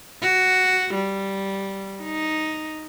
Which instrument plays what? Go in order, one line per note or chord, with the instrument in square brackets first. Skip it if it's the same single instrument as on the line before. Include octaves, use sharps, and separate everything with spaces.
[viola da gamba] F#4
G3
D#4